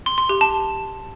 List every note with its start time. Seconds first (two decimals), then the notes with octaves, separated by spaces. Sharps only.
0.06 C6
0.18 C6
0.29 G4
0.41 A5